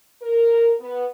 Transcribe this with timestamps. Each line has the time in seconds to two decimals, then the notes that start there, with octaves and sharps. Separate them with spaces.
0.22 A#4
0.80 B3